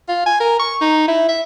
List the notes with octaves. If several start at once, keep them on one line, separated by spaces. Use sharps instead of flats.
F4
G#5
A#4
C#6
D#4
E4
E5